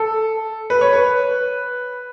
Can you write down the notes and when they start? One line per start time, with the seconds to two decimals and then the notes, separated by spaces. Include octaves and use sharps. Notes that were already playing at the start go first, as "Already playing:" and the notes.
Already playing: A4
0.70 B4
0.81 C#5
0.93 B4